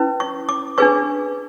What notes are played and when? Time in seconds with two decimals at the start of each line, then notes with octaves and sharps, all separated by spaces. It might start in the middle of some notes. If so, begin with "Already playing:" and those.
Already playing: C#4 E4 B4
0.20 C#6
0.49 D6
0.78 D4 G#4 B4 C#6